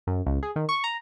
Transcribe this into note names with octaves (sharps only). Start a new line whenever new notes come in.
F#2
C#2
G#4
D#3
C#6
A#5